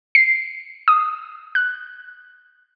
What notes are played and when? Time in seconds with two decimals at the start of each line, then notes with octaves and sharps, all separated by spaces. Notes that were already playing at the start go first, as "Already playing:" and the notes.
0.15 C7
0.88 D#6
1.55 F#6